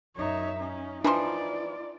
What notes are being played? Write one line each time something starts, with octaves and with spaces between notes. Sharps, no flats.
F#2 D#4 C#5 E5
C#4 D#4
E3 F3 D4 F4 D5 A#5 C6